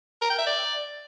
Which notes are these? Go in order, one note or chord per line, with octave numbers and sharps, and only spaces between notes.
A#4
G5
E5
D5